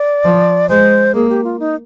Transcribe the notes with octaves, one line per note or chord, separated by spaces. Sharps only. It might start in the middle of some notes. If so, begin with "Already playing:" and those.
Already playing: D5
F3
G#3 C5
A#3 G#4
G4
F4
D#4